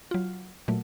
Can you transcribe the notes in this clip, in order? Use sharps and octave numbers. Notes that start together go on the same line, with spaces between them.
F#3 F4
A#2 F#3 A3